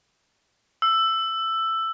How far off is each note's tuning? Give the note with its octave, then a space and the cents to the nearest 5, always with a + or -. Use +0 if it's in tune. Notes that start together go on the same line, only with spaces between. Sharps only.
E6 +10